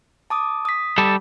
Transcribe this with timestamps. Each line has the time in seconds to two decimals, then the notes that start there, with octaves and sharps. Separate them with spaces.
0.30 A5 D6 D#6
0.65 D#6 B6
0.98 G3 A4